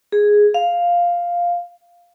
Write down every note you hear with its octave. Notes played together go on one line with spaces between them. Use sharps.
G#4
F5